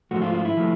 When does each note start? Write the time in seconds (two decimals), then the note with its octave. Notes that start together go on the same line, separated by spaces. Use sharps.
0.11 G#2 F3 A3 F#4
0.22 F4
0.34 F4
0.45 E4
0.57 F3 A3